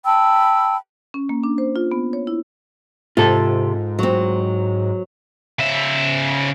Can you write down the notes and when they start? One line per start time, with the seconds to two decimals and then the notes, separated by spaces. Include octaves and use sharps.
0.05 G5 A5 B5 E6
1.14 C#4
1.29 A#3
1.44 D4
1.58 C5
1.76 F4
1.92 B3
2.13 C#5
2.27 E4
3.17 G#2 C3 F4 A4
3.99 F#3 C4
5.59 C#3 E5